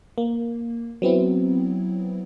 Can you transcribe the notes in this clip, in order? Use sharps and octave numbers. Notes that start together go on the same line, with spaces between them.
A#3
F#3 B3 C4 E4